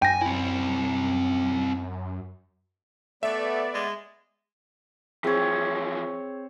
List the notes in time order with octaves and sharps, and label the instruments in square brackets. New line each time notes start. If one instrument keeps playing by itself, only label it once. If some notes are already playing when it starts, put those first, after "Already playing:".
[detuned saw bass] F#2 [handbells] G5 A#6 [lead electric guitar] G#5
[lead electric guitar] C4 E4 [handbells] G#5
[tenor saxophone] A3 [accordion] B3 D5 [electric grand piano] E5
[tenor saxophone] G#3
[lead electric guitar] E3 F3 [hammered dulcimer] C4 C#5 [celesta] G#4